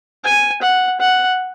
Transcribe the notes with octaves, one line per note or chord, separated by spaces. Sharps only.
G#5
F#5
F#5